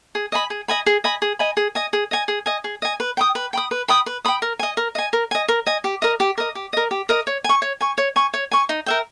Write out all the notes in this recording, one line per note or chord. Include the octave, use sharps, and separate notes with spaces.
G#4
D#5 G#5 B5
G#4
D#5 G#5 B5
G#4
D#5 G#5 B5
G#4
D#5 G#5 B5
G#4
D#5 G#5
G#4
D#5 G#5
G#4
D#5 G#5
G#4
D#5 G#5
B4
G5 B5 D#6
B4
G5 B5 D#6
B4
G5 B5 D#6
B4
G5 B5 D#6
A#4
D#5 G#5
A#4
D#5 G#5
A#4
D#5 G#5
A#4
D#5 G#5
G4
A#4 D#5
G4
A#4 D#5
G4
A#4 D#5
G4
A#4 D#5
C#5
G#5 C#6
C#5
G#5 C#6
C#5
G#5 C#6
C#5
G#5 C#6
D#4
A#4 E5 G5